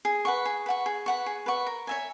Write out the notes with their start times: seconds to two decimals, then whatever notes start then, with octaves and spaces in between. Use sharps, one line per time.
0.05 G#4
0.25 B4 F#5 C#6
0.45 G#4
0.66 B4 F#5 C#6
0.86 G#4
1.06 B4 F#5 C#6
1.26 G#4
1.46 B4 F#5 C#6
1.67 A#4
1.87 C#5 E5 G#5